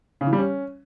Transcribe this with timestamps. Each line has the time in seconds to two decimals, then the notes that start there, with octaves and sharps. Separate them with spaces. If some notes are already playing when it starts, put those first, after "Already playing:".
0.21 C#3
0.27 E3
0.33 G3
0.39 C#4